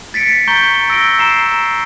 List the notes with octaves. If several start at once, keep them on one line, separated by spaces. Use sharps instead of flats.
A6 B6 C#7 D7
A#5 C#6 G6 G7
E6 A#6 D7 G7
A#5 C7 E7